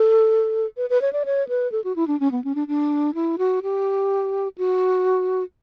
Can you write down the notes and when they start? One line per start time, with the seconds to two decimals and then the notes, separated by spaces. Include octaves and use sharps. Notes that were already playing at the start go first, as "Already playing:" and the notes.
Already playing: A4
0.77 B4
0.90 B4
1.02 C#5
1.13 D5
1.25 C#5
1.49 B4
1.72 A4
1.84 F#4
1.96 E4
2.08 D4
2.20 C#4
2.32 B3
2.44 C#4
2.55 D4
2.68 D4
3.15 E4
3.38 F#4
3.63 G4
4.58 F#4